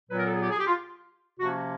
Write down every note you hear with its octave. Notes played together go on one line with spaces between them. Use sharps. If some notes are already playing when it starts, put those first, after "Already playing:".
A#2 F#3 B3 B4
A#4
A4
G#4
G4
G#4
G4
F4
C3 F3 A#3 C#4 F#4